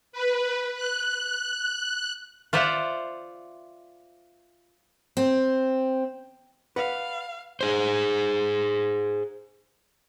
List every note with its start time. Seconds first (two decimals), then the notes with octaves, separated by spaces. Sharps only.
0.12 B4
0.75 F#6
2.53 F4 C5 D5 E5 F#5
5.17 C4
6.76 B4 D5 F5 F#5
7.61 G#4 C5